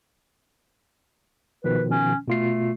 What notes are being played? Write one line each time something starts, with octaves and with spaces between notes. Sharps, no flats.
B2 D#3 F3 B4
C#4
B2 A3 F4 C7